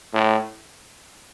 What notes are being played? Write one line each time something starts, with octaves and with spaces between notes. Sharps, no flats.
A2